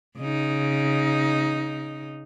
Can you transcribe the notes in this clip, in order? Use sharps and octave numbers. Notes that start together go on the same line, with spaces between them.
C#3 D#4